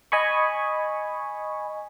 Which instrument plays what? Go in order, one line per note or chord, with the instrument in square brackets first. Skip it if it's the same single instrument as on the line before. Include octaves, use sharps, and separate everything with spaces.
[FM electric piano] D#5 G#5 B5 C#6